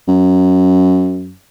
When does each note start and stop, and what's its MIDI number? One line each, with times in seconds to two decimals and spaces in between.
0.08 1.34 42